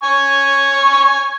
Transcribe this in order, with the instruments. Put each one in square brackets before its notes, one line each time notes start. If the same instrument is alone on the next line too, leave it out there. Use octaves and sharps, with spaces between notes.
[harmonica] G#5 C#6